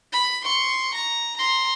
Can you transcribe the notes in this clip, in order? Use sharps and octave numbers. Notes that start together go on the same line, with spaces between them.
B5
C6 C#6
A#5
A#5 C6